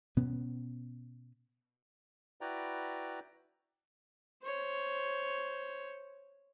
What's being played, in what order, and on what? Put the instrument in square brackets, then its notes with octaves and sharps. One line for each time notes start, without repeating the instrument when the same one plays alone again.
[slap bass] B2 B3 C#4
[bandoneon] E4 F#4 B4 D5 G5 A#5
[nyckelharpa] C5 C#5